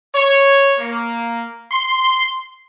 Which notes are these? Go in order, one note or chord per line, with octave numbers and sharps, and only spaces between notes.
C#5
A#3
C6